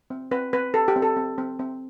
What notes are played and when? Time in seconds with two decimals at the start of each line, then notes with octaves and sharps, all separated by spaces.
0.10 C4
0.31 C4 B4
0.53 C4 B4
0.74 G4 A4
0.88 G4
0.96 C4
1.02 A4
1.17 C4
1.38 C4
1.59 C4